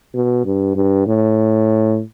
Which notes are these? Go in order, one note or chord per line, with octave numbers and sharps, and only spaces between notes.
B2
G2
G2
A2